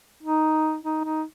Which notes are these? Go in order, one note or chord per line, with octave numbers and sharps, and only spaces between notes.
D#4
D#4
D#4